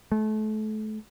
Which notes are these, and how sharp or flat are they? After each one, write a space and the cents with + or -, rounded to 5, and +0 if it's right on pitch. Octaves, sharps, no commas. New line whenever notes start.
A3 -30